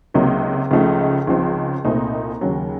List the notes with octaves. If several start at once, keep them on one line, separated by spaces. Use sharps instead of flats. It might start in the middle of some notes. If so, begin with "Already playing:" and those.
C#2 C3 F#3 A#3 D#4
C#2 C#3 F3 A3 D#4
C#2 C#3 F3 C4 D#4
C2 A#2 A3 C4 D#4
D#2 C#3 F#3